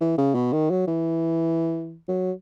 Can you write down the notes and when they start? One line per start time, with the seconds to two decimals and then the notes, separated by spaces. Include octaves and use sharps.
0.01 E3
0.18 C#3
0.34 B2
0.53 D#3
0.70 F#3
0.87 E3
2.08 F#3